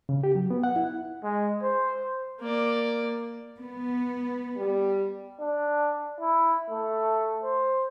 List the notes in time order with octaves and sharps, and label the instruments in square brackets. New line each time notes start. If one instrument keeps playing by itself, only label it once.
[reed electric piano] C#3
G4
F#3
B3
F#5
E4
[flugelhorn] G#3
C5
[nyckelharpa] A#3 D5
[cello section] B3
[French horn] G3
[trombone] D4
E4
A3
C5